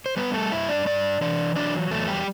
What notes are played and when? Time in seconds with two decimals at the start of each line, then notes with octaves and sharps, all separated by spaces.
0.06 C5
0.17 G3 B3 B4
0.34 A3 A4
0.52 G2 E4 E5
0.69 D4 D5
0.86 G2 D4 D5
1.21 E3 D4 D5
1.55 F#3 D4 D5
1.91 E2 A3 A4
2.08 G3 G4